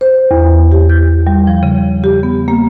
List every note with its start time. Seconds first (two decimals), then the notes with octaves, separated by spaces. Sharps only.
0.01 C5
0.31 E2
0.72 G4
0.90 G6
1.27 G3
1.47 F3
1.63 C#3
2.04 G4
2.23 B3
2.48 A#3